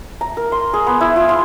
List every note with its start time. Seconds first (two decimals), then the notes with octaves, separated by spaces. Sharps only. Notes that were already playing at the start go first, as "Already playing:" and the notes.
0.21 A#5
0.37 A#4
0.52 C6
0.73 G#4
0.87 B3
1.01 E4
1.16 F4
1.29 C6